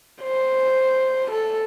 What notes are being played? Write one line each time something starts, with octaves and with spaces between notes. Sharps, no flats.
C5
A4